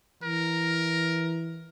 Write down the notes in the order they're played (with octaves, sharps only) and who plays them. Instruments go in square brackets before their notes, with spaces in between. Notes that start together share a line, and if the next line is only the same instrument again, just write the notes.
[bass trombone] E3 [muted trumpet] A#4